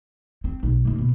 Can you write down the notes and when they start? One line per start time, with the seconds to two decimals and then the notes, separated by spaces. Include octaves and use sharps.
0.44 C4
0.63 B1
0.85 F#1 A#3
0.99 B2